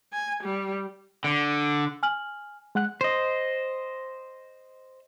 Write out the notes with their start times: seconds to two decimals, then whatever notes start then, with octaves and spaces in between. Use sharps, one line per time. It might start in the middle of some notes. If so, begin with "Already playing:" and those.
0.13 G#5
0.43 G3
1.24 D3
2.03 G#5 F6 F#7
2.75 G#3 F#5 F#6
3.01 C5 D#5